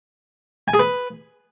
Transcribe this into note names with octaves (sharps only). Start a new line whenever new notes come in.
G#5
G#4
B4